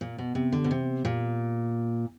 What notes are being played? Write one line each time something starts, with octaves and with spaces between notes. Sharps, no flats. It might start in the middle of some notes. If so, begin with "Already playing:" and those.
A#2
B2
C3
D3
B2
C3
A#2